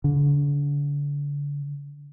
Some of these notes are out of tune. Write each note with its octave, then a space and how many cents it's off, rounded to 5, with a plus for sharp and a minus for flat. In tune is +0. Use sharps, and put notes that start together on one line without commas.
D3 -35